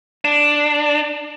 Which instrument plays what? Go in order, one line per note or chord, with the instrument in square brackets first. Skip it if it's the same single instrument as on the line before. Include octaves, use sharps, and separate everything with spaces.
[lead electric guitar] D4